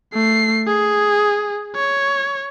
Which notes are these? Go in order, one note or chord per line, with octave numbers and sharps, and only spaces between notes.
A3 C7
G#4
C#5